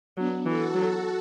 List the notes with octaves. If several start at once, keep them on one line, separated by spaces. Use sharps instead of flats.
F#3 B3 D4
E3 F#4 A4
F#3